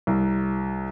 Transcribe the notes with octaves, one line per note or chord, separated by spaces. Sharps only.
C2